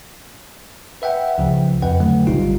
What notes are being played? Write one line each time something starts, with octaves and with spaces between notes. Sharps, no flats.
B4 E5 F#5 G5
C#2 C#3 F3
F2 B4 F#5 G5
D3 F#3 A3
A1 C3 G3 D#4 F4